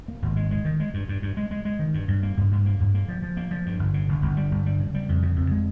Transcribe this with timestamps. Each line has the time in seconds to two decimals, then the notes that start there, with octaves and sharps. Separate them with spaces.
0.08 A#3
0.22 G#1
0.36 G#3
0.51 G#3
0.65 D#3
0.80 G#3
0.94 G2
1.08 G2
1.22 G2
1.37 G#3
1.51 G#3
1.65 G#3
1.79 D#3
1.94 G2
2.08 G2
2.23 A#3
2.37 G2
2.51 G2
2.66 A#3
2.80 G2
2.94 A#3
3.08 F3
3.22 F3
3.37 A#3
3.51 F3
3.66 G2
3.79 G1
3.94 C#3
4.09 G1
4.22 G1
4.37 G3
4.51 G1
4.66 G3
4.80 C#3
4.94 G3
5.09 F2
5.23 C#3
5.37 F2
5.51 G#3